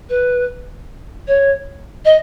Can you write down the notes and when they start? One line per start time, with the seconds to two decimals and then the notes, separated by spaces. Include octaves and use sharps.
0.09 B4
1.27 C#5
2.05 D#5